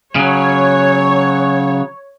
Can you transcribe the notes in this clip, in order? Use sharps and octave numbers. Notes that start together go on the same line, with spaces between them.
C#3 F#3 C#5